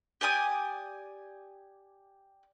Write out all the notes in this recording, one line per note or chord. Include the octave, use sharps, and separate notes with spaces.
G4 D5 G#5 D#6